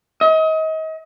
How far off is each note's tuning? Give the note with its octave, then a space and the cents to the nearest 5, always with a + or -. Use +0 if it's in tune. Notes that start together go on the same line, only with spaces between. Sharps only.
D#5 +35